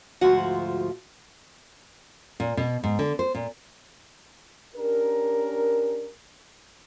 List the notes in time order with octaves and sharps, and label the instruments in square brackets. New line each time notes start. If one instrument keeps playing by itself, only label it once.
[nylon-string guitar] D2 G#2 F3 F4 F#4 F#5
A#2
B2
G#2
D3
C5
A#2
[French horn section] C#4 D4 G4 A#4